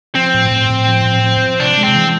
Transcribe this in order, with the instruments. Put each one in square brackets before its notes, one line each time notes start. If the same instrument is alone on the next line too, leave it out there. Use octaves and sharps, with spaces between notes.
[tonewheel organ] F3 [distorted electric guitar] C4
[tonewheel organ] A2
A2
A2
F3
A2
F3
F3
[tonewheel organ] C3 [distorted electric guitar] D4
[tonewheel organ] G#3
[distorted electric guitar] C4
[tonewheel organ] E3